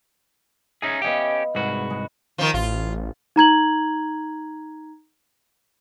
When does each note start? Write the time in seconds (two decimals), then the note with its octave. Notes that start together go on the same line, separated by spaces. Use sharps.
0.82 C#4 D#4 G#4 E5
1.02 B3 C#4 G4 D#5 F5
1.55 C2 G#2 F#4 G#4 B4 B5
1.90 G#3
2.38 D#3 F3
2.54 A1 F4
3.36 D#4 A#5 G#6 F#7